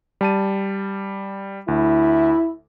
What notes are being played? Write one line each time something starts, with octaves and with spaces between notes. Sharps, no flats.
G3 A5 D#7
D2 E4